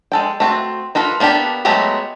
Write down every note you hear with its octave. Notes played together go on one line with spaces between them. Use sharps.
G#3 A4 G5
A3 C4 F#4
A#3 F4 A4 B4
A#3 B3 D4 G4 A4
F#3 G#3 A3 B3 G4